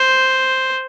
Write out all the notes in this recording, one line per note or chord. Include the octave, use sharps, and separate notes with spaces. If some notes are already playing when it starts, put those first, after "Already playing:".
Already playing: C5